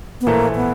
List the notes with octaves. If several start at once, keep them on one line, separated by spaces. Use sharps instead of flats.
B3
A#1 A2 E3 A3 A#3
B3